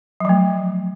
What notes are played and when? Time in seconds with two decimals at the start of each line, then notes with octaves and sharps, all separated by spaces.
0.20 F#3
0.25 F3
0.29 A3